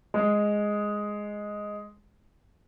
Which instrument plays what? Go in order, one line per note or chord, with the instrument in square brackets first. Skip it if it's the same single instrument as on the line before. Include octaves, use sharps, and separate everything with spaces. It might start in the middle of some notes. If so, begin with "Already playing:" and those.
[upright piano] G#3